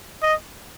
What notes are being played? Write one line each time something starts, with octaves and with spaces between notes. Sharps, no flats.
D#5